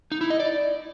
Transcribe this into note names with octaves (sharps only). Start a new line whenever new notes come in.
D#4
E4
D#5
D5